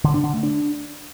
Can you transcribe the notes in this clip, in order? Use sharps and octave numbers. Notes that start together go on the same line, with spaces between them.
D3
D4
D3
A3
D4